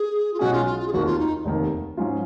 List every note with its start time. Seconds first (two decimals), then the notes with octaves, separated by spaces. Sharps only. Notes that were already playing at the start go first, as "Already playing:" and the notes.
Already playing: G#4
0.33 F4
0.39 B1 B2 G#3 C#4 F#4 G#4
0.52 F4
0.66 F4
0.79 F4
0.87 G#4
0.92 F1 D#2 D#3 F#4
1.05 F4
1.18 D#4
1.45 F1 D#2 D#3
1.97 G#2 F#3 C#4 F4